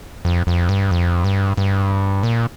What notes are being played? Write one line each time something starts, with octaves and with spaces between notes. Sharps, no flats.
F2
F2
G2
F2
G2
G2
A#2